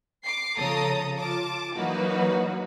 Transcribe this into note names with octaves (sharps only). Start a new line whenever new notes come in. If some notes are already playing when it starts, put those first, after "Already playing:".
D6 C7
C#3 F3 A4 A#5 D#6
F4 A5 D6
E3 F#3 A#3 D#4 F#4 B4